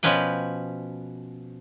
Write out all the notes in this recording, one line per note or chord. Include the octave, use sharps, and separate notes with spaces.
B2 F3 C#4 B4 G5